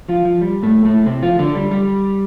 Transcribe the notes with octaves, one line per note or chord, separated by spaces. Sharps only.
F3 F4
F3
G3
A2 A3
A2 A3
C3 C4
F3 F4
D3 D4
G3
G3